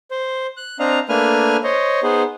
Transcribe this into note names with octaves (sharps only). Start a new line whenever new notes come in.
C5
F#6
C4 D4 D#5 F5 A#5
A3 A#3 D4 B4 G#5 F6
C5 C#5 D#5
B3 D#4 G#4 C5